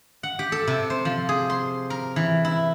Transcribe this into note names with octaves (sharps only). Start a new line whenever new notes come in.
F#5
G4
A4
C3
C5
F3
G#4
C6
A#4
E3
E4